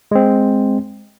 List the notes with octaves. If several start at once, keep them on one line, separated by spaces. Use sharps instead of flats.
G#3 C4